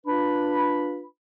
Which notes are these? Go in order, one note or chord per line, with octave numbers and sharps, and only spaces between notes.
D4 F4 B4 B5